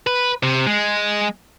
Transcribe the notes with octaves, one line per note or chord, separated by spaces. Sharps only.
B4
C3
G#3